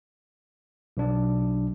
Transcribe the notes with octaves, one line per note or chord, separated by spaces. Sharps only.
B1 D4